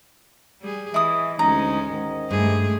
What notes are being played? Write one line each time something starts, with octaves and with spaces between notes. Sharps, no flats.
G3 G#4
E3 E4 D#5 D#6
D2 G#3 C#4 D#4 A#5 D#6
G#2 D#3 D#5
G2 G#3 A3 G#4